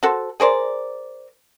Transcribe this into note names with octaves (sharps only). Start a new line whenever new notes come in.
F#4 A4 C5
G#4 A#4 C5 D5